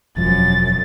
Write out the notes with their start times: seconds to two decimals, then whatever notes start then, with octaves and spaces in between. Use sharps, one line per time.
0.17 E1 F#2 F3 A6